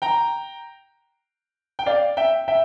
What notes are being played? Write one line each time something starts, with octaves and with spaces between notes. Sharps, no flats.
G5 A#5
G5
D5 F5
E5 G5
E5 G5